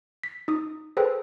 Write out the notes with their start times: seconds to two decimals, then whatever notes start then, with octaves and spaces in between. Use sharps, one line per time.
0.24 B6
0.48 D#4 D#6
0.97 G#4 A4 B4 C5 G5